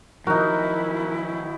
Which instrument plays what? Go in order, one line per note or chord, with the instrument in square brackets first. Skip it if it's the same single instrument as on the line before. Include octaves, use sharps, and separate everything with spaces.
[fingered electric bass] D#3 F3 F#3 [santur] D#4 F#4 [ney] E4 [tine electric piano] A#4